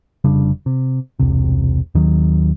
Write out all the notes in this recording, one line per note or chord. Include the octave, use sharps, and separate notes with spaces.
F1 C#3 G3 D4
C3
E1 C2 C3
D#2 D#3 F#3